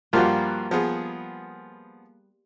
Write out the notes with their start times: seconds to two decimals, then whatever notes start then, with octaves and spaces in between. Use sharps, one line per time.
0.13 G2 F3 G3 A#3 F4 F#4
0.71 F3 B3 G#4